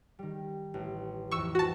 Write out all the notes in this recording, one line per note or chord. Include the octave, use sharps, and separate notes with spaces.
D#3 G3
A1
F2 E3 C#6 E6
F#4 A5